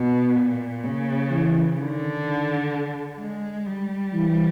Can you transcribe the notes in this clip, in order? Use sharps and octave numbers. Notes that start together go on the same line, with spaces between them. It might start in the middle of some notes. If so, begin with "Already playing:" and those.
Already playing: B2 B3
A#2
C#3 A#3
E3
D3 D#3
D#3
G#3
G3
E3